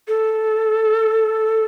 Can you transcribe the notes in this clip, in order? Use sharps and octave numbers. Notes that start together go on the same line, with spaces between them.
A4